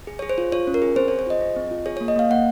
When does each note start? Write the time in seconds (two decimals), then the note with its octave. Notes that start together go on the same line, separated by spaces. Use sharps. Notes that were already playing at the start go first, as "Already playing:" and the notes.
0.07 G#4
0.19 G#4 C#5
0.29 C5
0.38 F4
0.52 F4 C#5
0.67 C#4
0.74 A#4
0.82 G#4
0.96 C4 C5
1.08 G#4 C#5
1.19 C5
1.27 F4 D#5
1.41 G#4
1.56 C4
1.71 F4
1.86 G#4 C#5
1.97 A#3 C#5
2.08 D#5
2.16 A#3 F5
2.30 A#3 F#5